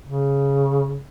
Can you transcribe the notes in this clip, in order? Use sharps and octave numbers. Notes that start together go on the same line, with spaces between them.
C#3